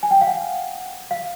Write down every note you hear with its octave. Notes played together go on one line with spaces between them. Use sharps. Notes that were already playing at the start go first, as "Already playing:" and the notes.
G#5
G5
F5
F#5
F5